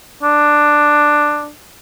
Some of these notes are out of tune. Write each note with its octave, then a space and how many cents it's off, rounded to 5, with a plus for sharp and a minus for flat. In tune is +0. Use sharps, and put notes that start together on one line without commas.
D4 +10